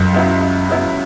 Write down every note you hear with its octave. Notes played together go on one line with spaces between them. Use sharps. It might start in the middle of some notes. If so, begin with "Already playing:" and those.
Already playing: C#2 F#2
C#3 F#3 B3 E4
C#2
C#3 F#3 B3 E4